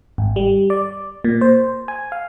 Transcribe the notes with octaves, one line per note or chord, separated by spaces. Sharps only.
G#1
G3
D5
A#2
C5
G#5
F5